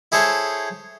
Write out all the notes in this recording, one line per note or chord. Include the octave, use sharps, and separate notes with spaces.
E4 G#4 A4 C5 C#5